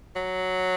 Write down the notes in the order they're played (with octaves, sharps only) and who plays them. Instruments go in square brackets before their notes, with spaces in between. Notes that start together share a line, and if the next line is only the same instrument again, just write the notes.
[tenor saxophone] F#3